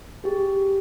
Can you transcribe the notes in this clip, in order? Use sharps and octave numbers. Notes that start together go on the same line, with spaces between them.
G4 G#4